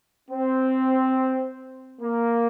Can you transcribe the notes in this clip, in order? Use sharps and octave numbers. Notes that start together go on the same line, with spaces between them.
C4
A#3